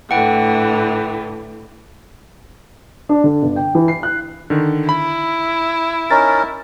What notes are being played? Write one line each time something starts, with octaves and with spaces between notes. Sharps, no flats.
A2 D3 E3 F#5 G5
D4
D3
G1
G5
E3
C7
F#6
D3 D#3
E4 B5
C#4 D#4 A#4 A6